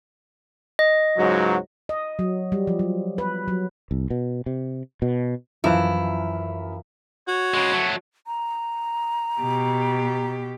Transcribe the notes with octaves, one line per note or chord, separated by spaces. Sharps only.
D#5
C#2 G#2 F#3
D#5
F#3
G3
F3
F#3
B4
F#3
C2
B2
C3
B2
F#2 E3 F3 E4 F5
F#4 C#5
C#3 G#3
F#3 A3
A#5
B2 G4